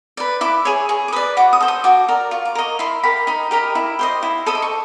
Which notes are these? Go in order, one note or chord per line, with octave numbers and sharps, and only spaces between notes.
B4 D5
E4 D6
G#4 C#5
G#4 C#6
D6
B4 D5 D#6
F#4 D6
D#6
A4 C5
D#6
F#4 D6
A#4 D5
F4 C#6
D6
A#4 D#5 C#6
E4 C6
G4 A#4 B5
D#4 B5
G4 A#4 D#5
E4
G4 C5 D#5
E4
A4 C5 D#5 D#6
D6
C#6